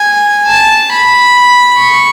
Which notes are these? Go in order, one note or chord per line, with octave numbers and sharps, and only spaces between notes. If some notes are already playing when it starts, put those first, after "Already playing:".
Already playing: G#5
A5
B5
C#6